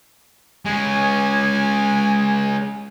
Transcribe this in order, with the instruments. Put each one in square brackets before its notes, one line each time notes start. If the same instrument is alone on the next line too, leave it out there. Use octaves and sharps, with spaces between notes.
[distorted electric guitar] G#3 C#4 [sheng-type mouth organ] G#5